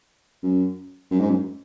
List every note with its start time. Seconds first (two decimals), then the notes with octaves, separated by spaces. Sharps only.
0.43 F#2
1.11 F#2
1.20 G#2
1.30 F#2